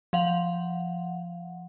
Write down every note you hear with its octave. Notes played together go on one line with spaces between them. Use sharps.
F3 F5 F#5